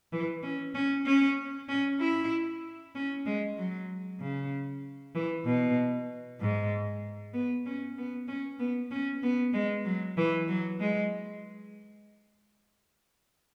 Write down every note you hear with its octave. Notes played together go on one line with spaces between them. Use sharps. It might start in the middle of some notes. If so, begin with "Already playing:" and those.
E3
C#4
C#4
C#4
C#4
E4
C#4
G#3
F#3
C#3
E3
B2
G#2
B3
C#4
B3
C#4
B3
C#4
B3
G#3
F#3
E3
F#3
G#3